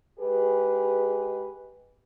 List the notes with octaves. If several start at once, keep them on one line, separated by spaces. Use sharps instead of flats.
G#3 G4 G#4 B4